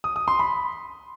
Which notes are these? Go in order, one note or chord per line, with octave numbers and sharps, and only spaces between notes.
D#6
D#6
C6
B5